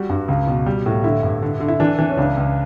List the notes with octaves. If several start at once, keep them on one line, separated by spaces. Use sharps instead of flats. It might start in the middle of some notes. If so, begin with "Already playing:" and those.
Already playing: G3 F#4
G2
C#2
B2
G3
A2
D3 E4
G2
D3
D3
E4
E3 D4
E3 D4
C#4
C#2 D4
C#2